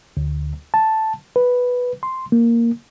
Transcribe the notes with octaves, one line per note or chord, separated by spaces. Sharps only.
D2
A5
B4
C6
A#3